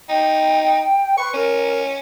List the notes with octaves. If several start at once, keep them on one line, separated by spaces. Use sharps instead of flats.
D#4 G5
B4 C#6
C#4 A#4